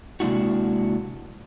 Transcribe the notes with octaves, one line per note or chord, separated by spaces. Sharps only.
C3 G#3 A#3 D4 E4 F#4